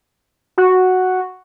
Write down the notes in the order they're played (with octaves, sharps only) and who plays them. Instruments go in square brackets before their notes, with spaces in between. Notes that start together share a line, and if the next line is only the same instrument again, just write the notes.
[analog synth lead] F#4